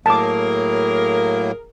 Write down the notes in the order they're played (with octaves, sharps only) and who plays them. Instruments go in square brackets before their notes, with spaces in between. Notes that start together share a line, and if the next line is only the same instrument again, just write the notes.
[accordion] A2 F#3 A#3 [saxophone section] G#4 A#4 [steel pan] A5 D6